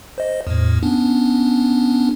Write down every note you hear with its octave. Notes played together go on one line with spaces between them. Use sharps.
C5 D#5
E2 A2
B3 C#4 D4